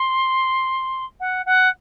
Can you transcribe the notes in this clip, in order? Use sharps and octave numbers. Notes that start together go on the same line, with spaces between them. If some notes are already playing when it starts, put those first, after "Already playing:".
Already playing: C6
F#5
F#5